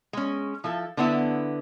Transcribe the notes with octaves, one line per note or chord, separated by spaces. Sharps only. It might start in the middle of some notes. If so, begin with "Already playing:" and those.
G#3 C#4
F3 E4 A4
D3 B3 E4